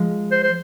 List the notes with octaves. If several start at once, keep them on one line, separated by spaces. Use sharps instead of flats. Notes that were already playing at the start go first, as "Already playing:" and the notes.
Already playing: F3 G#3
C5
C5